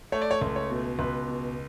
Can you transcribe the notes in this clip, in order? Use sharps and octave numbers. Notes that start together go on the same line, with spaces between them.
A3 C#5
D5
C#5
C#2
C#5
B2
C#2 B4
B2